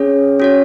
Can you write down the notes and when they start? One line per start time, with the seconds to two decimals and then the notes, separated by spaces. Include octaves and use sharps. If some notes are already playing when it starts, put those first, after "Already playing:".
Already playing: C#4 G#4 C#5
0.40 C#4 F#4 C#5